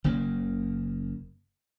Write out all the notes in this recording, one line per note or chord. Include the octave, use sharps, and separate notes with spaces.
F#1 C#3 A#3